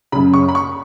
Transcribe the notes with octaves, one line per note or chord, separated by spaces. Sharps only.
F#2 C#3 B5
C#6
B5
C#6